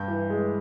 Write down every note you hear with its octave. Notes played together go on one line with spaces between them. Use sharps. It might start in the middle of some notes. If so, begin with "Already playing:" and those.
Already playing: G2 G6
E3
G#3